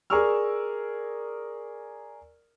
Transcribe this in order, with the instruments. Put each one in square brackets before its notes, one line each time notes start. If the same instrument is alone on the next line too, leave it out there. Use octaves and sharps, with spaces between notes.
[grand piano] G#4 A#4 D5 C#6 E6 F6